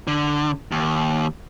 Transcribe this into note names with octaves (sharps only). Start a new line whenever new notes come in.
D3
D#2